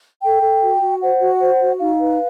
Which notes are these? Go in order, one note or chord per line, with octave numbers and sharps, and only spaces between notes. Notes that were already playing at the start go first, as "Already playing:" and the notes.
A4 G5
A4
F#4
F#4
C5 F#5
F#4
C5
F#4
D#4 F5
B4